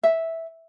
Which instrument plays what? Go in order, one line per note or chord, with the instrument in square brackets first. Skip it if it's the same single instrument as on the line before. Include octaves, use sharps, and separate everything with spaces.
[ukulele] E5